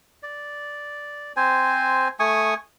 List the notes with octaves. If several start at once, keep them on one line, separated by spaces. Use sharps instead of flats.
D5
C4 C5 G#5
A3 G#5 C#6 D#6